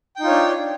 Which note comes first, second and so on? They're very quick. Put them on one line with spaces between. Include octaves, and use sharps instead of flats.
G5 D#4 F4 C#5 D4